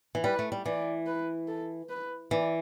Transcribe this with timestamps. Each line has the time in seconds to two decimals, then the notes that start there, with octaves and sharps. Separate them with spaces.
0.15 E3
0.24 G3 B4
0.39 A3
0.52 G3
0.65 E3 D5
1.07 B4
1.48 A4
1.90 B4
2.31 E3 D5